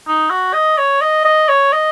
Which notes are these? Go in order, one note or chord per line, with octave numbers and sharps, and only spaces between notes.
D#4
F#4
D#5
C#5
D#5
D#5
C#5
D#5